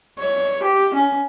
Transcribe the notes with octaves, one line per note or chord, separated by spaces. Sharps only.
C#5
G4
C#4